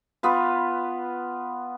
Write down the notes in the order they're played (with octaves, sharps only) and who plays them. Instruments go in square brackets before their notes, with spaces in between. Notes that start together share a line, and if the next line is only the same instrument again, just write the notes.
[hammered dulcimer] B3 F4 B4